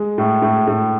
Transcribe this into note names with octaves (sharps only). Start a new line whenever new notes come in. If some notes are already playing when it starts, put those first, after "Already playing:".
Already playing: G#3
A2
A2
A2